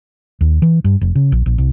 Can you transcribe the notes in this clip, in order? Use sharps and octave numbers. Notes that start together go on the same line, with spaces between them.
D#2
E3
G2
F1
C#3
A#1
A#1
C2